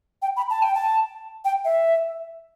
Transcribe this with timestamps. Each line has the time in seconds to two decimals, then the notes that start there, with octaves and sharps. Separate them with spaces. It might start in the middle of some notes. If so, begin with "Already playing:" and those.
0.22 G5
0.37 B5
0.50 A5
0.62 G5
0.75 A5
1.45 G5
1.65 E5